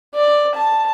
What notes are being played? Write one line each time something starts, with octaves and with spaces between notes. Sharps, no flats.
D5
A5